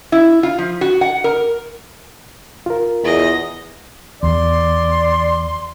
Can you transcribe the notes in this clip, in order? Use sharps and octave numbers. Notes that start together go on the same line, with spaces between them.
E4
F4
F3
F#4
F#5
A#4
F4 A#4
E2 D#5
E2 D5 C6